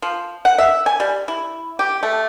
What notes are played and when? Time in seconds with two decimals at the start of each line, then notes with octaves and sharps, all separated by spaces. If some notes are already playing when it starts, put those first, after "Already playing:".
0.02 F3
0.45 F#5
0.58 E5
0.86 G#5
1.00 G3
1.28 E4
1.79 G4
2.03 A3